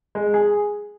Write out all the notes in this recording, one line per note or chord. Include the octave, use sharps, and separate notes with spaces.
G#3
G#4